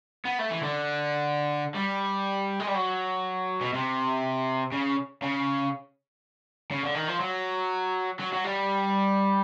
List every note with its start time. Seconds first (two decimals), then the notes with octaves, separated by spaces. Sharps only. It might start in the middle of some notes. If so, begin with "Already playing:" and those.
0.25 B3
0.39 A3
0.51 E3
0.63 D3
1.75 G3
2.60 G#3
2.67 G3
2.74 F#3
3.61 B2
3.73 C3
4.73 C#3
5.23 C#3
6.71 C#3
6.83 D3
6.95 D#3
7.08 F3
7.20 F#3
8.20 F#3
8.33 F#3
8.44 G3